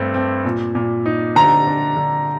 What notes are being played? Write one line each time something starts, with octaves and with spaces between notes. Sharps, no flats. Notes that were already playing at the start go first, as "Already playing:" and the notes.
Already playing: G2 A3 C4
C4
A#2
A#2
D#4
D3 A#5
D4
D3